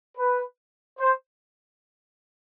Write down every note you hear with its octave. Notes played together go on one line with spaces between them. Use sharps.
B4
C5